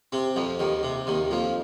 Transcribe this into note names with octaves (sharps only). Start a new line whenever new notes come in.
C3 C4
F2 F3
D#2 D#3
C3
D#2 D#3
F2 F3